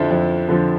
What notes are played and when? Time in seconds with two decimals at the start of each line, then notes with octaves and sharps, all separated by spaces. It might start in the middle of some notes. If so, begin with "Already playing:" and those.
Already playing: F2 D3 F3 E4
0.10 F2
0.49 D3 F3